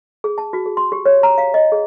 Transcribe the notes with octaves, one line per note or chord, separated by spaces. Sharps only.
G#4
A5
F#4
G#4
C6
G4
C#5
A#5
F5
D#5
G#4